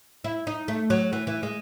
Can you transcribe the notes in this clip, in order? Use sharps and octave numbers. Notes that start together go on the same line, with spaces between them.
E4
D#4
A3
F#3
E3
E3
G#3